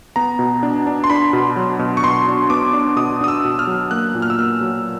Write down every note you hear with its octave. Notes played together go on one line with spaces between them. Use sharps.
B3 A#5
B2
D4
D4
C6
D4 B5
B2
F#3
B2
C#6
B2 C6
D4
B3 D6
D4
B2 D#6
D4 D#6
E6
B2
F6
F#3
A#3 F#6
A#2
F6
E6
A#3 F6
F#3